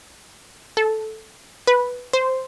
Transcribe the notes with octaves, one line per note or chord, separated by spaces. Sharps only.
A4
B4
C5